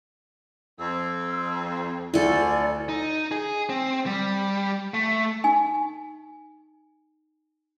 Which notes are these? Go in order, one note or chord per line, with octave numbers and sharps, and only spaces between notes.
F2 C4 E6
D2 E4 F4 A4 D5 G#5
D#4
G#4
C4
G3
A3
D#4 G#5